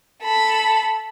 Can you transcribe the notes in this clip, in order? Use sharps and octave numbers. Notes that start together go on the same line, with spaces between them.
A4 B5